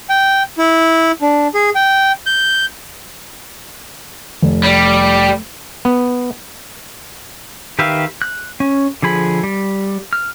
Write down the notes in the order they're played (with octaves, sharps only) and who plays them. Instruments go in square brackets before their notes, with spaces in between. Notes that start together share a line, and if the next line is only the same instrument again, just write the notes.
[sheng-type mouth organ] G5
E4
D4
G#4
G5
G6
[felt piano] F1
[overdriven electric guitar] G3
[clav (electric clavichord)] B3
[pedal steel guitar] D#3 G4 B4 E5 F5
F#6
C#4
D3 F3 G#4 B5
G3
F6